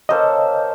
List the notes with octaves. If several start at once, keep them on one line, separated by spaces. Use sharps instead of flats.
A#3 C#4 A4 C5 D#5